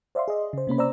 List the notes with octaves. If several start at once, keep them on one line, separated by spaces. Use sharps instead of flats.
C5 D5 E5 F5 C6
G#4 D#5
C#3 C5
C3 A#3 C#4 B5
C5 D5 A#5 E6